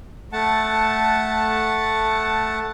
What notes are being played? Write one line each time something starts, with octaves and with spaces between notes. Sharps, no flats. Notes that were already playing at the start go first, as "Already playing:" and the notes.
A3 F#5 A5